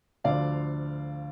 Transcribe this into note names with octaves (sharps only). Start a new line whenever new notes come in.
D2 D3 F3 D5 F5